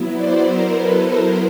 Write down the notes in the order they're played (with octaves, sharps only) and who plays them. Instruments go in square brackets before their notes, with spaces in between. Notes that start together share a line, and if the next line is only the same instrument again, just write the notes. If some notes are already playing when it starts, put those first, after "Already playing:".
Already playing: [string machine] F#3 B3 E4
C5 D5
A#4 C5
A4 B4
A#4 C5